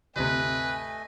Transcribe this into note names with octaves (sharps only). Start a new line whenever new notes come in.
G1 D2 C3 A3 B4 D#5 G#5